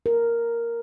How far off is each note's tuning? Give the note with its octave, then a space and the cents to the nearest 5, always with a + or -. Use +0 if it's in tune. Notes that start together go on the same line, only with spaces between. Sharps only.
A#4 +0